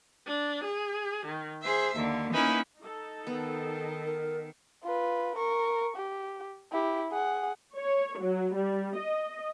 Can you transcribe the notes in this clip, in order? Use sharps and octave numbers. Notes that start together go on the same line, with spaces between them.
D4
G#4
D#3
G#4 C5 E5
D#2 D3
A#3 C#4 D#4 E4 B4
D#4 A4
D#3 B3
A#4
F4 B4
A#4 C#6
G4
E4 G4
G#4 F#5
C#5
F#3
G3
D#5